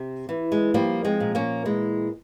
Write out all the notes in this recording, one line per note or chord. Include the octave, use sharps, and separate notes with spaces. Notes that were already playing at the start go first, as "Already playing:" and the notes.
Already playing: C3
E3
G#3
F3 G3 A#3
G#3 C4
A#2
A#3 C#4
E3 G#3